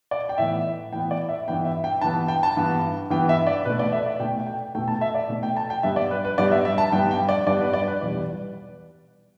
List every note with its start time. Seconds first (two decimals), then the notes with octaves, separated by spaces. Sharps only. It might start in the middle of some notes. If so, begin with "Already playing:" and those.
0.11 D5
0.29 G5
0.38 A2 E3 B3 E5
0.92 A2 E3 B3 G5
1.11 D5
1.29 E5
1.47 G2 E3 B3 G5
1.65 E5
1.84 G5
2.01 G2 E3 B3 A5
2.28 G5
2.43 A5
2.56 G2 E3 B3
3.10 G2 E3 B3 G5
3.29 E5
3.47 D5
3.65 B2 A3 B4
3.79 D5
3.92 E5
4.06 D5
4.20 B2 A3 G5
4.47 G5
4.75 A3 G5
4.78 B2
4.88 A5
5.01 E5
5.14 D5
5.29 B2 A3
5.43 G5
5.57 A5
5.70 G5
5.83 G2 G3 B3 E5
5.96 D5
6.11 B4
6.25 B4
6.38 G2 G3 B3 D5
6.51 E5
6.65 E5
6.78 A5
6.92 G2 G3 B3 G5
7.11 G5
7.29 D5
7.46 G2 G3 B3 D5
7.61 B4
7.73 D5
7.88 B4
8.01 E2 B2 G3 D5